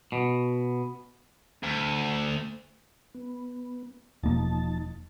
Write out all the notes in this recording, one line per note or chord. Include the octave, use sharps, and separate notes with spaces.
B2
D2
B3
E1 F3 A#3 D#4 A5